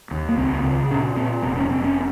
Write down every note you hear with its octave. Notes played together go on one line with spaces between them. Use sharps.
D#2
A#3
C#2 C4
C#3
A#2 C#4
A#2 C4
F1 C4
C#4
F1 C4
C#4